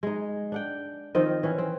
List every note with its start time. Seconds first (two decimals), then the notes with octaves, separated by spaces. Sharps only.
0.03 G#3 D#4
0.52 D4 F#5 G5
1.15 D#3 F3 C4 D#5
1.43 E3 C#4
1.58 C4